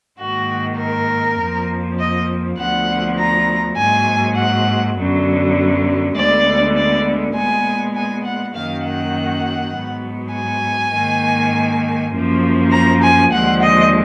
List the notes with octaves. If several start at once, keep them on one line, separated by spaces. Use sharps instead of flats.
G#2 D#3 A#3 F#4
A#4
F2 F3 A#3
D#5
D2 D3 F3 B3 F#5
A#5
G#2 F#3 A#3 G#5
F#5
F#2 D3 F#3 B3
D2 D3 G#3 B3 D5
D5
A#2 G#3 B3 G#5
G#5
F#5
F#2 D#3 F#3 A#3 F5
F#5
G#2 F#3 B3
G#5
G#2 D#3 A#3
F#2 F3 A#3
A#5
G#5
D#2 D3 F3 G#3 F#5
D#5